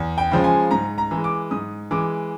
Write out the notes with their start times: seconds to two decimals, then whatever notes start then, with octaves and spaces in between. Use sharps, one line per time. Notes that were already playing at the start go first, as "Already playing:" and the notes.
Already playing: E2
0.18 G5
0.32 C#3 F3 G#3
0.44 G#5
0.71 G#2 A#5
0.98 A#5
1.11 E3 G#3
1.24 D6
1.51 G#2 D#6
1.91 E3 G#3 D6